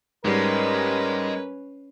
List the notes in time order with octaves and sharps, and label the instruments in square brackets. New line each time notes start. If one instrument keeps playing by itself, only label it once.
[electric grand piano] G#2 G3 [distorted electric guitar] G#3 [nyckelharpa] C#4 B4 [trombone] A#4